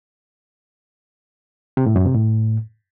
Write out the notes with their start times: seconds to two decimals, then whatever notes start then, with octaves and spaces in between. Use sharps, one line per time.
1.77 C3
1.86 A2
1.96 F#2
2.05 C3
2.14 A2